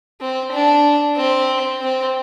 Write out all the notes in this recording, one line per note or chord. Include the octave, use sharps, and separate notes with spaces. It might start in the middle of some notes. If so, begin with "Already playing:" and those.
C4
D4
C4
C4